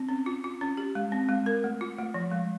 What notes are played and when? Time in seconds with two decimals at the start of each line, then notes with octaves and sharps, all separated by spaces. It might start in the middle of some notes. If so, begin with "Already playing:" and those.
Already playing: C4
0.09 C#4
0.26 F4
0.44 F4
0.61 C#4
0.77 G4
0.95 G#3
1.12 C4
1.29 G#3
1.46 A#4
1.64 A3
1.81 F4
1.98 A3
2.14 F3
2.32 G#3